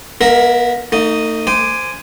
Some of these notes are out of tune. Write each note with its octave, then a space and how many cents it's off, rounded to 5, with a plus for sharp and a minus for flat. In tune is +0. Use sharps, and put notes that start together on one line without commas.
B3 -40 A#4 +0 E5 +0
A3 +45 D#4 +0
C5 -20 G#5 +0 D6 +10